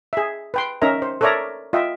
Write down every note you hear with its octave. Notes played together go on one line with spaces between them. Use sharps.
G#4 E5
B4 G5 C6
C#4 D#4 A#4 E5 A#5
C5
A4 A#4 C#5 D5 E5 A#5
F4 D#5 E5 G5